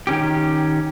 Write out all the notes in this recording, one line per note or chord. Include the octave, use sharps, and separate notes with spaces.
D#3 C#4 G4